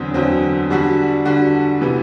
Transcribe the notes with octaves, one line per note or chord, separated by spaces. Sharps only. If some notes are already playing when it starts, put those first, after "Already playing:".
Already playing: E2 D3 F#3 C4
E2 D3 F#3 C4
D3 G3 D4 F#4
D3 G3 D4 F#4
C3 E3 B3